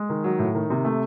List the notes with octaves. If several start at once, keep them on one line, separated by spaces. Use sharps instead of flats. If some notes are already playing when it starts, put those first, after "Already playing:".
Already playing: G#3
D#3
F#3
A2
D#3
C3
A3